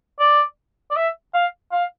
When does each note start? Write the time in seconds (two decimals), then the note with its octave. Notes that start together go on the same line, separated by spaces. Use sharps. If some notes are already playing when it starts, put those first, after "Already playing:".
0.20 D5
0.91 D5
0.97 E5
1.34 F5
1.72 F5